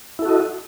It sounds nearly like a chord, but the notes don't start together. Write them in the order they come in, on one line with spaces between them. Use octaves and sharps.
E4 A4 F#4 D#5